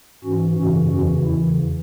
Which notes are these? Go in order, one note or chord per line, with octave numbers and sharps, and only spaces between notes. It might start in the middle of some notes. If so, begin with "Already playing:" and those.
G#2 E3 C#4 F#4
F#2 C#3 E3 C#4 F#4
E2 C#3 E3 C#4 F#4
E2 C#3 E3 E4